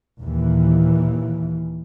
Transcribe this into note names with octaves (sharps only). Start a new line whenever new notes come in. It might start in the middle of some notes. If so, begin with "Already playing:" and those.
D#2 A#2 E3